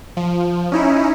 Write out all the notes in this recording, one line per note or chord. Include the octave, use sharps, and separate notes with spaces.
F3
C#4 D#4 E4